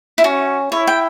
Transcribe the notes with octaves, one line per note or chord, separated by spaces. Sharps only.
E4
C#4 F#4
E4 C#5
G5